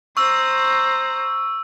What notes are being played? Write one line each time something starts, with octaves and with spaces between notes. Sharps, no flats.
C5 A#5 C#6 E6